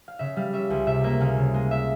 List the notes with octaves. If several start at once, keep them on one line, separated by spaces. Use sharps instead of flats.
F5
C#3 E5
G3 F5
C#4 E5
C#2
C3 E5
A#3 E5
C#2 F5
C#3
G#3
E5